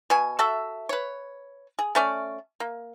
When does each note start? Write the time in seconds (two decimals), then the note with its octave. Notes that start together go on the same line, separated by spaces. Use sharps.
0.10 B2 G#5
0.39 F#4 A4 E5
0.89 B4 C#5
1.79 G#4
1.95 A3 C#4 D5
2.60 A#3